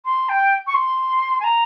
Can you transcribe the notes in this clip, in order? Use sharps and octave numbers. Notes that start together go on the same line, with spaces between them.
C6
G5
C#6
C6
G#5
A#5